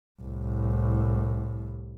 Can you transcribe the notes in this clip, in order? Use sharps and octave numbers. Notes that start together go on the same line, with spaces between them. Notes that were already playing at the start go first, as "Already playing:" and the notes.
C2 A2